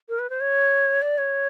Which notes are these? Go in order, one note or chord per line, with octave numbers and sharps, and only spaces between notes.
A#4
B4
C5
C#5
D5
C#5